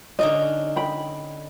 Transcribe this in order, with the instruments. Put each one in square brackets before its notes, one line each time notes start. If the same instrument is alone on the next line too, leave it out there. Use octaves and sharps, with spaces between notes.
[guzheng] D3 C#4 D#4 [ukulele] D#5
[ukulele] G5 B5